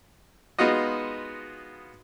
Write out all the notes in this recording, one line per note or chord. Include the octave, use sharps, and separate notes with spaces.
G#3 B3 D#4 F4 F#4 D#5